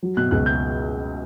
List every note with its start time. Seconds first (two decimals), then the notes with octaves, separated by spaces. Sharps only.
0.03 F#3
0.17 B2 F#6
0.31 C#2 F#6
0.46 G6